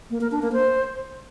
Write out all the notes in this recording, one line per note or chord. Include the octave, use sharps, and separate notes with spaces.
A#3
A#4
D4
A#3
C5